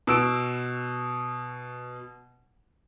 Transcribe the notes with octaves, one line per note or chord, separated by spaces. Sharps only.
B2 E6 D7